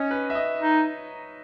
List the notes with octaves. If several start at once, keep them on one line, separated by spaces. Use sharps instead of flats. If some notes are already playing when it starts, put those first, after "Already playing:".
Already playing: C#4 C#5 D#5
B4
E5
D#5
D#4